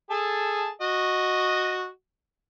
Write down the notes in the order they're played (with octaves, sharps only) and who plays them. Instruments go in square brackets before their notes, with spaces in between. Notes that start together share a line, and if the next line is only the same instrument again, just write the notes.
[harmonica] G#4 A4 A5
F#4 D#5